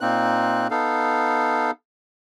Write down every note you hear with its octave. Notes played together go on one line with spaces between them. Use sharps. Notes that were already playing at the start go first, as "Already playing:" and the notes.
A#2 A#3 C4 D#4 F#6
B3 D#4 A4 F5